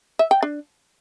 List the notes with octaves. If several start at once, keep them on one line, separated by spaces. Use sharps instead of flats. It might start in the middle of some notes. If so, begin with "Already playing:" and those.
E5
G5
D4